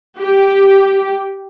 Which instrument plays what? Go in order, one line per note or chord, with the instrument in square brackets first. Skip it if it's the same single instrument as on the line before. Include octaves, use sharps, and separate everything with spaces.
[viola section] G4